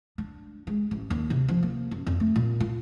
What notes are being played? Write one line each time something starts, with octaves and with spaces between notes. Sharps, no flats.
D4
G#3
A1
D#2
C3
F3
A#3
F#2
F2
A3
A#2
F4